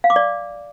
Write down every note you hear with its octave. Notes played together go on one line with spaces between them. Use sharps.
F5
D6
D5